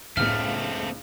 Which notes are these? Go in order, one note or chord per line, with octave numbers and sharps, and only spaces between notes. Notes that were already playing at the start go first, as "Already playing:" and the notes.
F#1 C#2 A2 A3 C4 D4 F5 F6